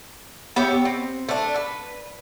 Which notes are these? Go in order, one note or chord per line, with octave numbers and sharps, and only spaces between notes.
B3 G4 C#5 E5
C4
A3 D4
B4